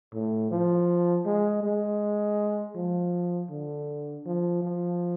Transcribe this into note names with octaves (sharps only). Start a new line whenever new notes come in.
A2
F3
G#3
G#3
F3
D3
F3
F3